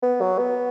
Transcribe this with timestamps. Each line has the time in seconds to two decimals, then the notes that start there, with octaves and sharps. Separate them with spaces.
0.03 B3
0.21 F#3
0.38 B3